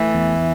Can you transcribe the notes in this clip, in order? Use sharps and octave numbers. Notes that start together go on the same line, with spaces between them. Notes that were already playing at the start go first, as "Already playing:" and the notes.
Already playing: E3 A3
E2